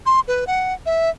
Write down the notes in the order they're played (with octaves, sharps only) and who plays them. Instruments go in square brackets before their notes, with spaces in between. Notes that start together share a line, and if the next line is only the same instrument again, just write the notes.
[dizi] C6
B4
F#5
E5